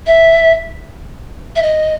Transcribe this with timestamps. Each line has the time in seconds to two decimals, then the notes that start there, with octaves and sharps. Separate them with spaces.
0.06 E5
1.56 E5
1.62 D#5